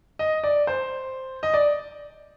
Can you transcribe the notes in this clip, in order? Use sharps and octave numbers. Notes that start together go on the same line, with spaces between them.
D#5
D5
C5
D#5
D5